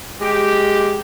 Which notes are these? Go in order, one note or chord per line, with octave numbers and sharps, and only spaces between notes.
G#3 G4